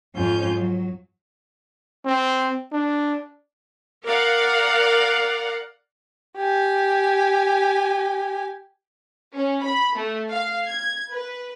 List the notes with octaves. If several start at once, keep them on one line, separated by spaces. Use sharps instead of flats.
F2 G#2 C#4 F4 G#5 G6
F#3
C4
D4
A#4 D5 F5 F#5
G4 G#5
C#4
B5
A3
F5
G#6
B4